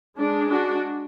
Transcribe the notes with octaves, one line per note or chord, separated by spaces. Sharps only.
G#3 D4
D4 F#4